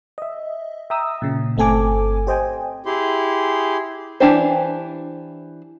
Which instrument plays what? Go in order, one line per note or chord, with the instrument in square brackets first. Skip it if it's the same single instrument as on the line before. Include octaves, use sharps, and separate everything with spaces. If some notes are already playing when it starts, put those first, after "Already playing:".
[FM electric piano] D#5 E5
E5 G5 A#5 D#6 E6
A#2 C#3
G1 A3 C4 A4 G#5 D6
G4 C5 D#5 G5 G#5
[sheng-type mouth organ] E4 G4 G#4 C6
[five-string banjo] E3 C4 D4 G4 C5